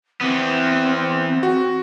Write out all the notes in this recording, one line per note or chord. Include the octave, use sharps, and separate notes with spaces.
E3 B3 C4
F#4